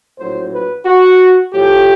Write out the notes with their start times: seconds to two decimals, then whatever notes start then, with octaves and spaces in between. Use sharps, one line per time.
0.18 A#1 A2 F#3 C5
0.52 B4
0.86 F#4
1.53 A2 F3 A3 G4